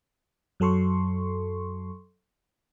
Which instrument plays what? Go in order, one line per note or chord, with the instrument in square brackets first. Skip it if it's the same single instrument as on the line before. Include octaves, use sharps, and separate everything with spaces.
[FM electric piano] F#2 F#3 A4 C6 C#6